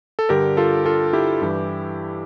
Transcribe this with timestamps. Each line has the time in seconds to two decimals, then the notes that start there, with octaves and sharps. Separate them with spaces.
0.19 A4
0.29 G2 D3 G4 A#4
0.57 F4 A4
0.85 F4 A4
1.13 E4 G4
1.42 G2 E3